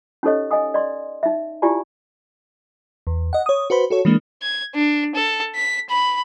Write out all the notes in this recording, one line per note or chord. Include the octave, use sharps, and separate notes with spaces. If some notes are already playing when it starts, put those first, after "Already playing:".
C#4 D#4 G4 A4 C#5 D#5
D#5 F5 G#5 D#6
D5 D#5 C6
D#4 E5
E4 F4 G4 D5 G#5 A5
E2
D#5 F#5
C#5 D#6
F#4 B4 C5 B5
F#4 A4 C#5
E3 G#3 A#3 D4
G#6
D4
A4
B6
B5